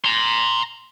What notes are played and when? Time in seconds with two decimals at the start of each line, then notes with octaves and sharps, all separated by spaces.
0.04 A#5 C6